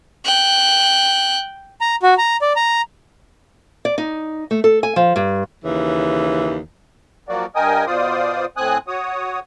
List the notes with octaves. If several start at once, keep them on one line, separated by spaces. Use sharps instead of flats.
G5 F#6
A#5
F#4
A#5
D5
A#5
D5
D#4
A3
A4
G#5
F3
G2
D#2 C#3 E3
F3 F#3 A#3 F#4 D5
G2 A#4 D#5 G5 G#5 D#6
B2 F4 C5 D5 D#6
A2 C4 G#5 D#6 F#6
F#4 C#5 D#6